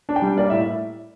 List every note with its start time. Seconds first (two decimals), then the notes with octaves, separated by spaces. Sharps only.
0.09 D4
0.16 G5
0.22 G3
0.37 A#3 D5
0.50 A2 E5